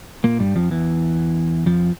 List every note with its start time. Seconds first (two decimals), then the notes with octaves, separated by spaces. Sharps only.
0.24 A#2 A#3
0.40 G2 G3
0.56 F2 F3
0.71 E2 E3
1.66 F2 F3